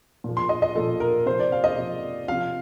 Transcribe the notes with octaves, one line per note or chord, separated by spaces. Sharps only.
A#2 F3
C6
D#5
D#5
A#2 F3 A4
A#4
C3 F3 C5
D5
F5
D#5
C3 F3
C3 F3 F5